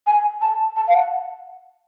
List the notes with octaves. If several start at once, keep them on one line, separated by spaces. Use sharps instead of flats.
G#5
A5
A5
F5
F#5